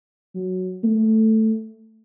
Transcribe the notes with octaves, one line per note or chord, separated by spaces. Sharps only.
F#3
A3